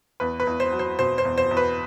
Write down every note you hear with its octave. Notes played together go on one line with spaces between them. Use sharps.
E2 B4
B4
E2
C5
F#3
C5
B2 C5
C5
E2
C5
E2
B4